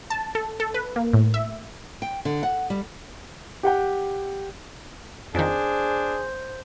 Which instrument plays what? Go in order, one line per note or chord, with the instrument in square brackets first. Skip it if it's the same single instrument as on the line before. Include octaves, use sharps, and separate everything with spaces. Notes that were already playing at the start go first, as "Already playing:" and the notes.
[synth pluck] A5
A4
A4
B4
A#3
A2
E5
[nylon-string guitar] G5
D3
F#5
G3
[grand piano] G4 F#5 G5
[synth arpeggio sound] F2 D#3 [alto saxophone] D4 [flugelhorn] G#4 [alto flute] C5